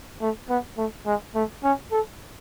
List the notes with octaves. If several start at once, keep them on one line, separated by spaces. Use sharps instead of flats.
A3
B3
A3
G#3
A3
C#4
A4